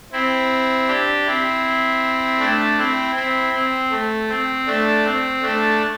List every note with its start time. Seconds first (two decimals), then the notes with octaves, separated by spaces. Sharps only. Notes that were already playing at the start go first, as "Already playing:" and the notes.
0.12 C4 E4
0.88 D4 G4
1.25 C4 E4
2.40 A3 D4
2.78 C4 E4
3.15 C4 E4
3.53 C4
3.91 A3
4.29 C4
4.67 A3 D4
5.05 C4
5.42 A3 D4